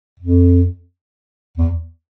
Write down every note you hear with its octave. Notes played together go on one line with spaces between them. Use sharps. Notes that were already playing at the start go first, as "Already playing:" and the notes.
F2
E2